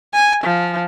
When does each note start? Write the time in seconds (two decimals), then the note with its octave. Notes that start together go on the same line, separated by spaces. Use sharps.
0.14 G#5
0.44 F3